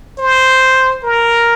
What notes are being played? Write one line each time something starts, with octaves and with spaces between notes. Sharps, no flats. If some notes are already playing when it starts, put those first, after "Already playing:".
C5
A#4